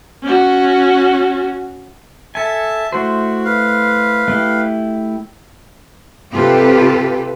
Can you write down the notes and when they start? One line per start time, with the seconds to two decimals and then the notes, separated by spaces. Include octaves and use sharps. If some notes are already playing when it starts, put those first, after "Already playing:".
0.23 C#4 F#4
2.35 A4 E5 G#5 A5
2.92 A3 E4 F#4 C5
3.45 B4 F5
4.28 A3 E4 G4
6.31 C3 F4 G4 A4 B4